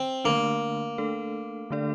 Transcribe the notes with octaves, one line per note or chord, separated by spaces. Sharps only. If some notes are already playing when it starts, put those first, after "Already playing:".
Already playing: C4
D3 A3 A#3 D4
A3 D4 A4
D3 A3 D4 A4 D5